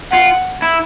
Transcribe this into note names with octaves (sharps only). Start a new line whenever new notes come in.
F4 F#5
E4